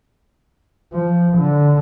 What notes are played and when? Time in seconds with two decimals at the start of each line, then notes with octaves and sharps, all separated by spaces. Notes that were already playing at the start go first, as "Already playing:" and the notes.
0.94 F3
1.37 D3